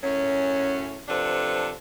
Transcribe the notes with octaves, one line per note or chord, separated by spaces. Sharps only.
F#2 A2 F#3 C#4
C3 F3 D4 A4 B4